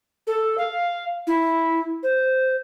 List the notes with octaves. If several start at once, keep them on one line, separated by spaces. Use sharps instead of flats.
A4
F5
E4
C5